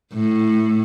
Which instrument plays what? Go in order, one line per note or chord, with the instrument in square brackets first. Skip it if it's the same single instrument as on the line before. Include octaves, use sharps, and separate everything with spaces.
[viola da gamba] A2